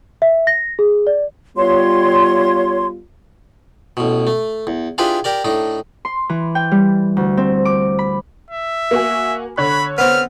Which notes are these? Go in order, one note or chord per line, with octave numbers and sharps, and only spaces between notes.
E5
A#6
G#4
D5
G3 B3 F4 C#5 C6
A1 B2
A3
E2
D4 E4 F4 G4 G#4 B4
G4 A#4 D5
A2 D4 D#4
C6
E3
G5
G3
D2
C4
D6
B5
E5
A#3 F#4 G#5
D3 C#5 B5 F#6
B3 C4 F6